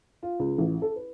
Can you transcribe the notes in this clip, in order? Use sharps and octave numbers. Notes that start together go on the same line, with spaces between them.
F4
C#2
A1
A4
B4